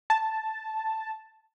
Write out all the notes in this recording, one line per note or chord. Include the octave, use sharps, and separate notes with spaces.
A5